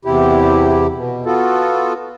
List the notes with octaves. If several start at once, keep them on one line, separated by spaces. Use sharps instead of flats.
E2 C3 E4 G4
B2
B3 F4 F#4 A4